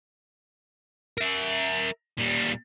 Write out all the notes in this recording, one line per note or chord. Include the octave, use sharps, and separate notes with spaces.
A#4 E5
A#2 G3